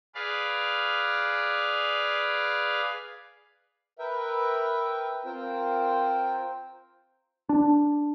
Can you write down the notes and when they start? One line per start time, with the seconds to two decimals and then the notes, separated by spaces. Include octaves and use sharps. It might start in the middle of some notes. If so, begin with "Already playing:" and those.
0.15 G#4 B4 D5 F5
3.99 A#4 B4 E5 G5
5.25 C4 F4 A#4 C5 G5
7.49 D4